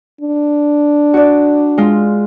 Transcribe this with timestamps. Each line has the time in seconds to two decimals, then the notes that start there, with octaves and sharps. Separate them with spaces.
0.21 D4
1.14 F#4 D5
1.78 G#3 F4